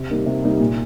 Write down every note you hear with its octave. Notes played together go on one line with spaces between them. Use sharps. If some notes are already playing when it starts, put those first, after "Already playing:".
Already playing: C3
G3 A#3 D#4
C3
G3 A#3 D#4
A#2